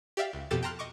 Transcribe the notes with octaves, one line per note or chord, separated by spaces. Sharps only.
G4 D5 E5 F5 G5
C#2
F2 B2 G4 A4 E6 A6
G5 A5 A#5 C6 F6 F#6
D#5 C#6 D6